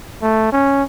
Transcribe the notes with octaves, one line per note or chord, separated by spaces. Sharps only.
A3
C#4